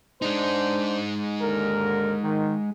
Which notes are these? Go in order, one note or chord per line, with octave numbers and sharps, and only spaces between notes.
G#3 D4 D#4 C5
D#2 D3 A#4
D#3